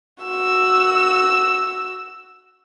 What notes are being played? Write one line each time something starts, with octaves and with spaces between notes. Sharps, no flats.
F#4 E6